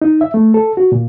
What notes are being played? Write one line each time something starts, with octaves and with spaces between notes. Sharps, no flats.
D#4
E5
A3
A4
F#4
A#2